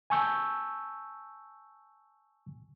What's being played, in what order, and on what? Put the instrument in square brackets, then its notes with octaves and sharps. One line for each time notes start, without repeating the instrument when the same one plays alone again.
[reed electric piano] G#5 A5 C#6 E6 G6